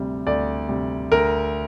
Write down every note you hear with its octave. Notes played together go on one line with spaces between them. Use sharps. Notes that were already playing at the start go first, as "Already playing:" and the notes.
Already playing: D2 C3 G3
D2 D5
C3 G3
D2 A#4